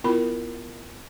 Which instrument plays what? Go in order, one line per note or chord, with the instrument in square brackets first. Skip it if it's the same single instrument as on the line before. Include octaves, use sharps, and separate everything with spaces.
[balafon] B3 E4 F4 A#4 B5